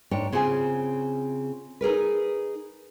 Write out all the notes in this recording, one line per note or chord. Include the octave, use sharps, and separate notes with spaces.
G#2 D4 C#5 G5
C#3 C4 F4 G#4 F#5 G#5
D#4 G#4 A#4 B4